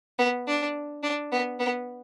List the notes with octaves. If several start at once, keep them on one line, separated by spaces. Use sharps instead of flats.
B3
D4
D4
B3
B3